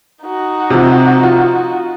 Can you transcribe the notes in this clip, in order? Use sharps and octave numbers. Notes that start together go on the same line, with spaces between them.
D#4 F#4
C3 F3
F4